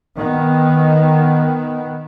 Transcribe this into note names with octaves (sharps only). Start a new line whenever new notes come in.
D#3 B3